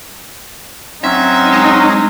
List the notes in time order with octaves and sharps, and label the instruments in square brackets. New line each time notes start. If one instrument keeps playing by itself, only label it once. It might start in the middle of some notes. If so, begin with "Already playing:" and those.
[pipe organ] F#3 C#4 [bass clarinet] C4 [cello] D#4 [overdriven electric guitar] E5
[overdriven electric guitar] G#3